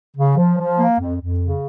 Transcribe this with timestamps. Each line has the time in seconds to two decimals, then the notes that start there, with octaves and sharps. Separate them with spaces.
0.16 C#3
0.37 F3
0.59 F3
0.78 A#3
0.99 F2
1.19 F2
1.39 C#3